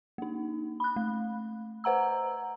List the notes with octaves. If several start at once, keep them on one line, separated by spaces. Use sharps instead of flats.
A#3 D#4
B5 F#6
A3
B4 C5 F#5 A#5 E6